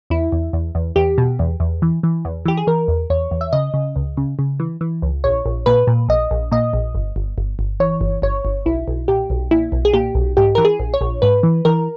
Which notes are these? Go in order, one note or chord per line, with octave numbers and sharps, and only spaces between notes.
E2 E4
E2
E2
E2
E2 G4
B2
E2
E2
E3
E3
E2
E3 G4
G#4
E3 A#4
E2
E2 C#5
E2
E5
C#3 D#5
C#3
C#2
C#3
C#3
E3
E3
C#2
A#1 C#5
A#1
A#2 B4
A#2
A#1 D#5
A#1
A#2 D#5
A#1
G1
G1
G1
G1
E3 C#5
G1
G1 C#5
G1
B1 E4
B1
A#2 G4
B1
A#2 E4
B1
G#4
A#2 G4
B1
G#2 G4
E3 A#4
G#4
A#1
C#5
A#1
G#2 B4
E3
E3 A#4